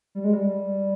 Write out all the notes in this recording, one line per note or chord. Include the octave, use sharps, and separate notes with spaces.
G3
G#3
G3